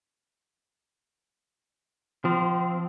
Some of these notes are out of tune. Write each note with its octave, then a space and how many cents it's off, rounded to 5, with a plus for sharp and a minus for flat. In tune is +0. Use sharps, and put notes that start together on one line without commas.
F3 +0 C4 -30